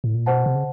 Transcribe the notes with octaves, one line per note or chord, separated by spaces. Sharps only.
A2
A#2
B2 C5 D#5 F#5 A5
C3
C#3